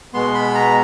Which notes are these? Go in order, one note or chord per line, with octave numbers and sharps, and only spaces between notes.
B2 G#3 B3 C6
B5
A#5